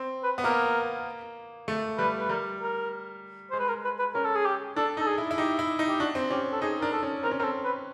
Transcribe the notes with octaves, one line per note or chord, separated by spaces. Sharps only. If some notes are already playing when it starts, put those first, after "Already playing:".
Already playing: C4
B4
B3
A#3 A#4
A3
G3 B4
B4
G3 A#4
A#4
G#3 C5
B4
A#4
B4
B4
C#4 A#4
A4
G#4
G4
D4 A4
D#4 A4
G#4
E4
E4
D#4 G4
E4
D#4
G4
D4 F#4
C4
C#4 G4
A4
D#4 G#4
D4 A#4
A4
C#4
C4 A#4
C#4
C4 A4 A#4
B4